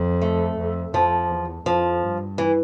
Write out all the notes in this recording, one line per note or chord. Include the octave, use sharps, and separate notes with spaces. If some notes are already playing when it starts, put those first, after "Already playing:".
Already playing: F2
A3
F2
F2 F3
E2
F2 F3
G2
E3